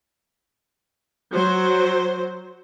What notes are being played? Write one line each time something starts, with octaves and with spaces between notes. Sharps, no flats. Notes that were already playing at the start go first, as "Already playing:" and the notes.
F#3 C5